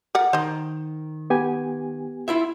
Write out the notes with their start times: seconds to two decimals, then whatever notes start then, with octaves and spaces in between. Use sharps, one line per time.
0.15 A#4 D5 F#5
0.33 D#3 C5 D#5
1.30 B3 G4 G#5
2.28 E4 F4 E5